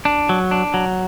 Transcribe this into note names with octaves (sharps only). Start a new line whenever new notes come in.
D4
F#3
D4
F#3